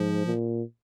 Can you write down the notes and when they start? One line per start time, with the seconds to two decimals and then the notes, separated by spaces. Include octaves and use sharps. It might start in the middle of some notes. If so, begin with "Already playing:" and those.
Already playing: G#2 F3
0.26 A#2